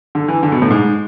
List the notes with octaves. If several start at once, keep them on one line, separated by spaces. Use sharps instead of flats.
D3
E3
D3
B2
A2
G#2